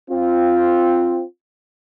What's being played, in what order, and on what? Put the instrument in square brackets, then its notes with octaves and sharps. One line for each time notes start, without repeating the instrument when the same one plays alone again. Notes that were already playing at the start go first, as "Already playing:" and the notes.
[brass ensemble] C4 F4